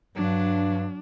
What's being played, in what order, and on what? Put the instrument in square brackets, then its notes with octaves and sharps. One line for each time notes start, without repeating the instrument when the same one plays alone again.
[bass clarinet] G2 [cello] F#3 [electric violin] D4